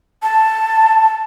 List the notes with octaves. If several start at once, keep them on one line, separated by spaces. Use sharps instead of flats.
A5